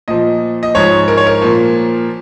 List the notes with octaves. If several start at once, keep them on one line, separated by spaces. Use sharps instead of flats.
A#2 F3 D#5
D#5
G#2 F3 C#5
A#4
C#5
A#4
A#2 F3